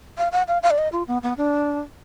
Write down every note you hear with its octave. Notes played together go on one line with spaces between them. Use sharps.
F5
F#5
F5
F5
D5
D#5
F4
B3
B3
D4